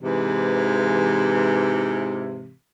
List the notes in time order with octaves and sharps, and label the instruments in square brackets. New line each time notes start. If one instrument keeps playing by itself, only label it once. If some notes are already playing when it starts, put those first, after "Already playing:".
[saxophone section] G#2 C3 E3